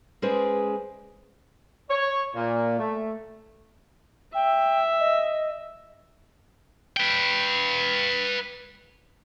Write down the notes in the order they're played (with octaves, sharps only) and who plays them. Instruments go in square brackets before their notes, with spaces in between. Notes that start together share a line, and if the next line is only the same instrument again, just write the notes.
[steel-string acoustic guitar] G#3 C#4 G#4 B4 C5 D5
[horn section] C#5
A#2
A3
[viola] E5 [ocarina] G5
[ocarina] D#5
[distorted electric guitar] B4 G5